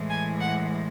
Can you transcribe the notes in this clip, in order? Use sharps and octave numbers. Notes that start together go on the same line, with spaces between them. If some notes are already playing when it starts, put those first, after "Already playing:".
Already playing: A2 E3 G#3
G#5
F#5